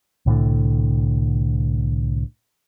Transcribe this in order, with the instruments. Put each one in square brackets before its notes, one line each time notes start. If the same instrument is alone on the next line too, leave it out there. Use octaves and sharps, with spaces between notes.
[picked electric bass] C2 A2 D3 A3